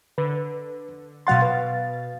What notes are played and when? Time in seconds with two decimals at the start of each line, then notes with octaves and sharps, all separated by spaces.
0.18 D3 B4
1.27 B2 F#3 F5 F#5 C6 A6
1.42 B4